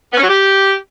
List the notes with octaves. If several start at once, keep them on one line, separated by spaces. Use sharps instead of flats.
B3
C#4
F#3
G4